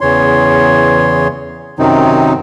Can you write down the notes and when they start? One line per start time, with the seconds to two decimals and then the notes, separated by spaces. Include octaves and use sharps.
0.01 E2 C#3 E3 C#5 C6
1.79 F#2 C3 D#3 F#3 C4 D#4